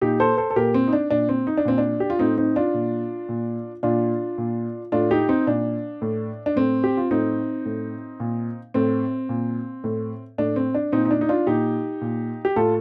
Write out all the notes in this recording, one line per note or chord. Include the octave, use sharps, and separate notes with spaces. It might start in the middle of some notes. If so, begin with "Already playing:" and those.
A#2 D#4 G4
A4 C5
A4 C5
A4
A#2 G4 A#4
C4
D#4
D4
A#2 D4
C4
D#4
D4
A#2 C4
D4
G4
F4
A2 C4 D#4
C4 D#4
D4 F4
A#2
A#2
A#2 D4 F4
A#2
A2 D4 F4
D#4 G4
C4 D#4
A#2 D4
A2
D4
A2 C4
G4
F4
A2 C4 D#4
A2
A#2
A2 C4
A#2
A2
A2 D4
C4
D4
A#2 C4 D#4
D#4
D4
D#4
D4 F4
A#2 D#4 G4
A#2
G4
A2 F4 A4